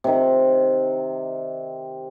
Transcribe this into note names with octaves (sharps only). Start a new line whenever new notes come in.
C3 D#3